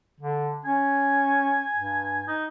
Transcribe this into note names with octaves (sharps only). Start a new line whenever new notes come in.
D3
C#4 G#5
G2
D#4